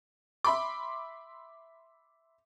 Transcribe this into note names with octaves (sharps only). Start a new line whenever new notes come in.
E5 B5 C6 D6